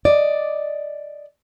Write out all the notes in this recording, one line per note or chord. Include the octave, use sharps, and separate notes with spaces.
D5 D#5